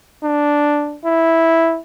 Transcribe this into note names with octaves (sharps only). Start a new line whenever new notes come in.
D4
E4